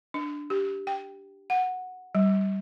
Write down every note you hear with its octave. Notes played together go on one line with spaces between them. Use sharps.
D4
G4
G5
F#5
G3